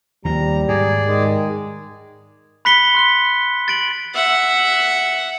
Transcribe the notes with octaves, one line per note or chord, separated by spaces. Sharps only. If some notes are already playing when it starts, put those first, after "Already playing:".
D#2 F3 G3 A#5
G#2 G#4 D5
D#3 G#3
B5 F#6 B6 C#7 G7
C6 F#6 G7
A6 D7 F#7
E5 F#5